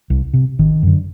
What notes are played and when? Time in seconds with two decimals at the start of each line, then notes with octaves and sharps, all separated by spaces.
0.10 C2
0.33 C3
0.59 G#1 D#3
0.83 F#2 D3